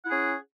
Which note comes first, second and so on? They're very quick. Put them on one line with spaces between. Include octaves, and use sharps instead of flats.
F#5 E4 G#4 C#4